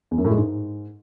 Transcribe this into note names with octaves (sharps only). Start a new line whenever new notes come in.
E2
F#2
A2
G#3
G#2